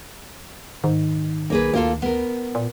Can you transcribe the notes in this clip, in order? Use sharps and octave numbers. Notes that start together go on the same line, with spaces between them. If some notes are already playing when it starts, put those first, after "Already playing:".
G#2 D#3
B1 A#3 G#4 B4
D2 A#3 F4 A4
B3 A#4
A#2